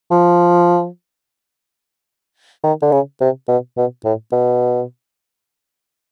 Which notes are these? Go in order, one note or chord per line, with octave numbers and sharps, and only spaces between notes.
F3
D#3
D3
C#3
C3
B2
B2
A2
B2